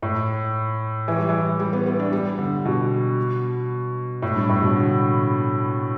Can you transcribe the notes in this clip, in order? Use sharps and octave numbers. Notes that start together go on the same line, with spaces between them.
A2
E3
G3
E3
G3
B3
B3
D4
G3
D3
B2
A2
G2
A2
B2
D3